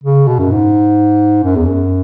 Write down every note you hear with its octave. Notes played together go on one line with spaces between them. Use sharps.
C#3
B2
F#2
G#2
F#2
E2
F#2